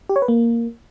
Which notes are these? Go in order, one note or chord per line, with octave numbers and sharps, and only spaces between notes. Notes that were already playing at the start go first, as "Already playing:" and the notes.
G4
C#5
B4
A#3